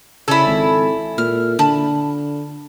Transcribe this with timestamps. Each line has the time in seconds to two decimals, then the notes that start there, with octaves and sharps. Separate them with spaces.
0.28 C#3 E4 A4 C#5 D5 G#5
0.47 G#1
1.18 A#2 F6
1.59 D3 A5 B5